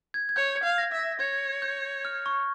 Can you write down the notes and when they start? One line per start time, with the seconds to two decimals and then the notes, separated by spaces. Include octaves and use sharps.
0.14 G#6
0.29 G#6
0.36 C#5 G6
0.57 G#6
0.63 F5
0.78 A#6
0.92 E5
0.99 A#6
1.20 C#5 G#6
1.62 G6
2.05 F6
2.26 C#6